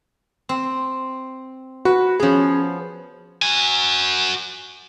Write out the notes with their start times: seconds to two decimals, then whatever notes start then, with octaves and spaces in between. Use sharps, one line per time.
0.49 C4
1.85 F#4 B4
2.20 F3 B3 C#4 G#4
3.42 F#4 G#5